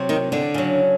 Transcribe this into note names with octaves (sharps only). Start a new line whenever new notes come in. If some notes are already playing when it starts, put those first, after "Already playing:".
Already playing: C3 F#3
D#3 D#4
D3 D4
C#3 F#3